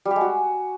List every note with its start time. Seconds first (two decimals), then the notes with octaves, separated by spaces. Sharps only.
0.05 G3
0.11 G4
0.16 G#3
0.21 F#4